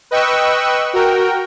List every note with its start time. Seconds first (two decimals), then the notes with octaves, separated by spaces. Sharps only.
0.11 B4 D#5 G5 C#6 E6 F#6
0.93 F#4 A#4 G5